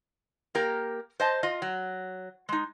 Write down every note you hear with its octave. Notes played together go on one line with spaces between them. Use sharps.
A#3 G4 A#4
C5 D#5 A5
F4 D#5
F#3
G#3 D#4